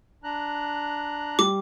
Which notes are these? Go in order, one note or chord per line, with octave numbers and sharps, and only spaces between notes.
D4 A#5 F#6
G3 D6